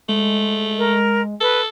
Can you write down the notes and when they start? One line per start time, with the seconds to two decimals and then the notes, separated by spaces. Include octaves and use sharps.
0.09 G#3 A3
0.78 A#4
1.41 A4 B4